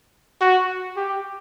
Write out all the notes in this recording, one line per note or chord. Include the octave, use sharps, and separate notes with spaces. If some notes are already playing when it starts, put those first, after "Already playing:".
F#4
G4